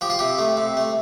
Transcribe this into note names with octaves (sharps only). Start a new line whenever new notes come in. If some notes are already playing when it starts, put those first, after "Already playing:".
F3 G4
F4
C3 G4
A3
C3
A3